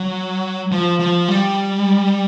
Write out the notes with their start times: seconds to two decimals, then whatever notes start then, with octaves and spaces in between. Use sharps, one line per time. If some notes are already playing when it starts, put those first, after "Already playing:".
Already playing: F#3
0.72 F3
0.99 F3
1.28 G3